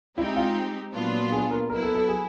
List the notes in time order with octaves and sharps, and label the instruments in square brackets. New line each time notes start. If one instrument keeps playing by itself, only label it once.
[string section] G#3 C4 D#4 G4 [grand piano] E4
[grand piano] F4
[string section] A#2 F#3 B3 D4 F4
[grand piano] G#4
A#4
[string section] F#3 B3 E4 [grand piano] A#4
[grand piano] A4
A4
G#4